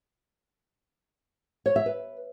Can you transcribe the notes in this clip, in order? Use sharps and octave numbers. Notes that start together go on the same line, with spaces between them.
C#5
E5
B4